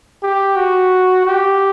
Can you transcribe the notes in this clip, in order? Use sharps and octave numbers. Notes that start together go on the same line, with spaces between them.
G4
F#4
G4